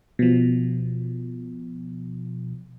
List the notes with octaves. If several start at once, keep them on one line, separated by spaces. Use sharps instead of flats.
B2 F3